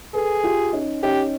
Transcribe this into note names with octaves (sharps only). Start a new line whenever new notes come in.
G#4 A4 B4
F4 G4
C#4 D#4
C#4 D#4 G4